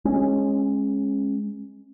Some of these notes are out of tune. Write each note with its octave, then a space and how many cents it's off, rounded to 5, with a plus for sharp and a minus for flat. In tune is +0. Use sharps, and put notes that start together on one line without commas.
G#3 +0 C#4 -20